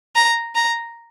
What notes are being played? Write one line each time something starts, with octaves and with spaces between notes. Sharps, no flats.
A#5
A#5